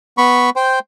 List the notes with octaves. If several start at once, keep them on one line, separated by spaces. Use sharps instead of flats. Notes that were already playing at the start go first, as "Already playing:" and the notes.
B3 B5 C#6
C5 G5